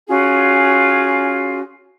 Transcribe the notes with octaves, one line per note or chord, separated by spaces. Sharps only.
C#4 F4 F#4 G#4